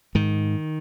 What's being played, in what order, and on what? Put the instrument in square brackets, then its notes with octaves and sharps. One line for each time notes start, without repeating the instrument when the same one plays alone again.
[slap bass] G#2 D#3